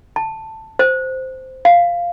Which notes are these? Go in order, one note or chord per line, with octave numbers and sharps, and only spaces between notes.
A5
C5
F5